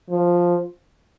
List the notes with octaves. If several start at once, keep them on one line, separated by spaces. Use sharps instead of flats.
F3